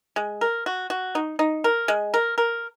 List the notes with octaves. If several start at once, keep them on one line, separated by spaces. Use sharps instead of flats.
G#3
A#4
F#4
F#4
D#4
D#4
A#4
G#3
A#4
A#4